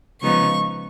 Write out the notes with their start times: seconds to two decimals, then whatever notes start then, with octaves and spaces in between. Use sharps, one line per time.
0.23 C#3 F3 G#3 B3 D#4 C#6